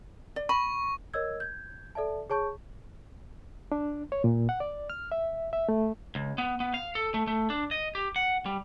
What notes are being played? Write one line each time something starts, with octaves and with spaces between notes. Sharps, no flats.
D5
B5 C#6
A#4 C#5 D#5 E6 G#6
G6 G#6
A4 D5 E5 A5
G#4 C#5 A5 C#6 G6
D4
C#5
A#2
F#5
D5
F6
E5
E5
A3
C#2
B3
B3
F5
A4
A3
A3
D4
D#5
G4
F#5
G3